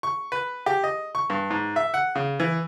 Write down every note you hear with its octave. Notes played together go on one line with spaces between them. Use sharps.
C#6
B4
G4
D#5
C#6
G2
G#2
E5
F#5
C#3
E3